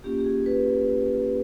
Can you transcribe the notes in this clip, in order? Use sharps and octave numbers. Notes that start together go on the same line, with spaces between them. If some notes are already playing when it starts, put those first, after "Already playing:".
A#3 C#4 F4 G4
G4
G#4
B4